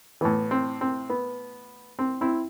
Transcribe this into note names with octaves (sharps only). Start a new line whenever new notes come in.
A2 E3 B3
C4
C4
B3
C4
C4 E4